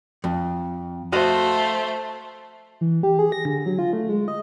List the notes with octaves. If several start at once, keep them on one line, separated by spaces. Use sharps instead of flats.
F2
A3 F#4 C5 D#5 F5
E3
G4
G#4
A#6
D3
F#3
F4
A3
G#3
D#5